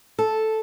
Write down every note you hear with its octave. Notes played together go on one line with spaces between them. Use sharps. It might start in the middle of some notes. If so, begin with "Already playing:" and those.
A4